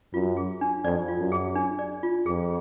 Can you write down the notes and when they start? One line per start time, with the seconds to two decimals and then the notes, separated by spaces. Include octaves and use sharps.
0.14 F#2 F4
0.37 G#4
0.61 D4
0.84 F2 D5
1.08 F4
1.19 F#2
1.32 G#4
1.55 D4
1.79 D5
2.03 F4
2.26 F2 G#4